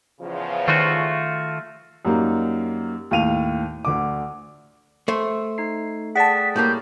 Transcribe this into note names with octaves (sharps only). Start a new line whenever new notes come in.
E2 C#3 F3
D#3 A3 F4 F#4
F#2 G3 A#3 D#4
D#2 A2 F5 D#7 F7
D2 D3 D6
A3 C5
D#4 C7
G#4 D5 F#5 G5 A5 B6
A2 G3 A#3 G6